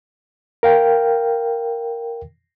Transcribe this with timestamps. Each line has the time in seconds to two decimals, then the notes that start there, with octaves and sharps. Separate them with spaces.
0.63 A#4 F5 G5